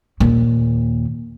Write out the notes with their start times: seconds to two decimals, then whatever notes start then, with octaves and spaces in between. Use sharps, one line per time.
0.20 D#2 A#2